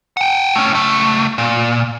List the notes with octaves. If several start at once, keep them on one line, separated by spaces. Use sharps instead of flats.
F#5 G5
A3 C#4
C#2 A3
A#2